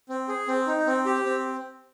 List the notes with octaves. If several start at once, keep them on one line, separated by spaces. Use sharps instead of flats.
C4
G#4
C4
D#4
C4
G4
C4